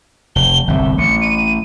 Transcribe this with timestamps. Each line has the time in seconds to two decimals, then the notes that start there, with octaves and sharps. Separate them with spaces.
0.36 F1 G7
0.67 G1 C2 E5
0.98 A1 C#7
1.22 D#7